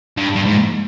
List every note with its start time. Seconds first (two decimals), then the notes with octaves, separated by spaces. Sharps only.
0.17 G2
0.36 G2
0.45 G#2